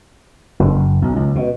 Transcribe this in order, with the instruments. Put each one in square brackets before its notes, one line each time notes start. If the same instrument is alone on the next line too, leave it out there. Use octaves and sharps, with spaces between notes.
[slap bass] F#1
B1
C#2
B2